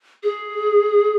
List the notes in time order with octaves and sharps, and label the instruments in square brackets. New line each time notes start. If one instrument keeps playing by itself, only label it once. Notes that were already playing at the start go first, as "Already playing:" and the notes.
[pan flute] G#4